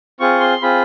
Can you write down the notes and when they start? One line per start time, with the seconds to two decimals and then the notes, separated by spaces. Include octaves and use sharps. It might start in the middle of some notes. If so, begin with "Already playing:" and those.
0.20 C4 F4 G#4 C#6
0.40 C6
0.62 C4 F4 G#4 B5